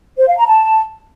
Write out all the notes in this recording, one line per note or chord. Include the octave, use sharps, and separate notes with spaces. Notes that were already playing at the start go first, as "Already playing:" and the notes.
C5
F5
A#5
A5